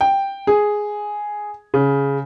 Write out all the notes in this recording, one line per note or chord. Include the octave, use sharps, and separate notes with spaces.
G5
G#4
C#3